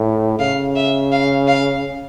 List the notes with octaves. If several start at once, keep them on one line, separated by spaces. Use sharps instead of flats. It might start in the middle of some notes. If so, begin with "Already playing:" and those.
Already playing: A2
C#3 F5
E5
F5
F5